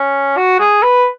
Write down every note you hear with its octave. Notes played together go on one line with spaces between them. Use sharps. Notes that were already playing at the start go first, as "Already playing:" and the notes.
Already playing: C#4
F#4
G#4
B4